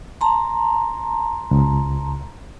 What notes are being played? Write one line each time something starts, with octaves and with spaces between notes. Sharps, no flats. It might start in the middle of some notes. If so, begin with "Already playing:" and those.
A5 A#5 C6
C#2